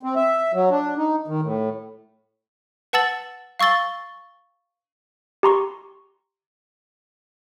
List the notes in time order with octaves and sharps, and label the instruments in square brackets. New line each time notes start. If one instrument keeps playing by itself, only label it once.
[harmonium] C4
E5
F#3
D4
D#4
D#3
A2
[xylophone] B4 F#5 A5 E6 A6 F#7
F5 C#6 E6 A6 G7
[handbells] G4 A#5 C6 C#6